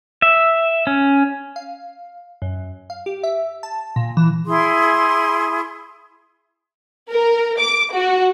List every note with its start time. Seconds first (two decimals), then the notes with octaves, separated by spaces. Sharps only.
0.22 E5
0.87 C#4
1.56 F5
2.42 F#2
2.90 F5
3.06 G4
3.23 E5
3.63 A5
3.96 A#2
4.17 E3
4.46 E4 G#4 C6
7.11 A#4
7.59 D6
7.93 F#4